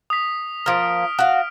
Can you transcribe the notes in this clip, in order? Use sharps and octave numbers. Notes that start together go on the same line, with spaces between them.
D#6 B6
F3 A#3 F6 D7
F#4 F5